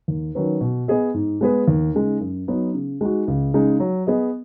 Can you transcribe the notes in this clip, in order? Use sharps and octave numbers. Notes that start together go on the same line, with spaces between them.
D#2
D#3 F#3 C#4 B4
B2
B3 G#4 D#5
G#2
G#3 B3 G#4 B4
D#2
C#3 G#3 D#4
F#2
F#3 B3 D#4 F#4
C#3
G#3 D#4 F#4
C#2
C#3 G#3 D#4
F#3
B3 G#4 D#5